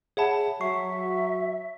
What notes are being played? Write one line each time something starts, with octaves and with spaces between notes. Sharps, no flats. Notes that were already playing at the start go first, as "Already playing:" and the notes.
G#4 C#5 E5 F#5 A5 B5
F#3 E5 C#6 C7